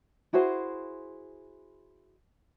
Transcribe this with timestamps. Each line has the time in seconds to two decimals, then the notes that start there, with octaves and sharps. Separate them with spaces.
0.33 E4 F#4 G#4 C5